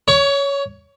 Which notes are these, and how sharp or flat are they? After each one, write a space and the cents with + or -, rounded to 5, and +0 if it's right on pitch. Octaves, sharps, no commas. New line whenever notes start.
C#5 +10 C#6 +35